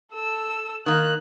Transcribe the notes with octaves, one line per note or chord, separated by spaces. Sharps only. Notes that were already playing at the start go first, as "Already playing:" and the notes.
A4 E6
D#3 A#3 F#6